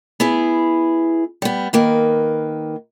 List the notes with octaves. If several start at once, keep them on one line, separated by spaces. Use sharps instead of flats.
B3 E4 G#4
G3 B3
D#3 A#3 B4